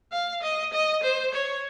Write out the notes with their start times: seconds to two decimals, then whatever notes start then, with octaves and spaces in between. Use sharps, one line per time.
0.12 F5
0.42 D#5
0.73 D#5
1.03 C5
1.34 C#5